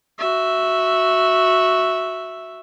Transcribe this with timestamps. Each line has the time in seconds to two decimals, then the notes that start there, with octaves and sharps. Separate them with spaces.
0.18 F#4 E5